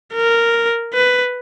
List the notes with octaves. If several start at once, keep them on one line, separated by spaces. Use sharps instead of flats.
A#4
B4